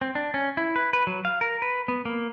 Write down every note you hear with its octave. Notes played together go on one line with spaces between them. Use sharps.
C4
D4
C#4
E4
B4
B4
F#3
F5
A#4
B4
B3
A#3